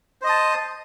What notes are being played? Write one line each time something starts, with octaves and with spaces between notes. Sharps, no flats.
C5 D#5 A5 D#6